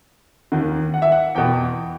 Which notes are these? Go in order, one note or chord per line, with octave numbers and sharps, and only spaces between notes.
D#2 D#3
F#5
E5
F#5
E2 B2 G5